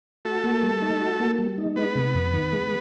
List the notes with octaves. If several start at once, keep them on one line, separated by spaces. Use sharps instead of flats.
A3 F#4 A4
A#3
G3
D#4
F#4
A#3
G3
D#4
G#3 B3 B4
C3
F2
D#3
G#3